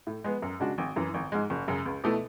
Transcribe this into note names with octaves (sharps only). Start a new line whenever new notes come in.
A2
G#3 B3
F#2
C#3 G#3 D4 F#4
G#1
F#2 E3
G#1
G#2 G#3
F#1
F#2 C#3
C#2
B2 A3 E4